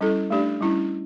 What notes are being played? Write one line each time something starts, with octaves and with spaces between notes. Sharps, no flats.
G3 C#4 E4 A4
A3 D4 G4 D5
G3 C#4 E4